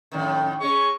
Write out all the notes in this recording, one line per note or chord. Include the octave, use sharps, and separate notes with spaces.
F2 A2 D#3
G#3 C#4 C#6